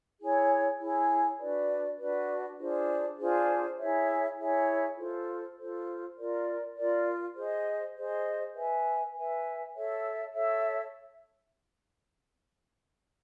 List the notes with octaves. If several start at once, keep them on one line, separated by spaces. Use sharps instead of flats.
E4 G#4 C#5
E4 G#4 C#5
D4 F#4 B4 D5
D4 F#4 B4 D5
D4 F4 G#4 C5
D4 F4 G#4 C5
E4 G#4 C#5 E5
E4 G#4 C#5 E5
F4 A4 C5
F4 A4 C5
F4 A#4 D5
F4 A#4 D5
G#4 C5 D#5
G#4 C5 D#5
B4 E5 G#5
B4 E5 G#5
A4 C#5 E5
A4 C#5 E5